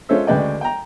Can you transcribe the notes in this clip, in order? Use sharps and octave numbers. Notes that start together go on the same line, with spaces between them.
G#3 C#4 F4 A4 C5 E5
D2 C#3 G#3 B4 D5 G5
G5 A#5